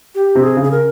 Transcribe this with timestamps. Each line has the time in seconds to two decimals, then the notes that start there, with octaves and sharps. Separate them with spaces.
0.15 G4
0.35 C3
0.43 G#4
0.57 C#3
0.63 G#4
0.71 A#4